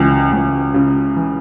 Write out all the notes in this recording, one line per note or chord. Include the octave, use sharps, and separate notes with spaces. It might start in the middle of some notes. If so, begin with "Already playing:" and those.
Already playing: C#2 E3
C#2
C#3
E3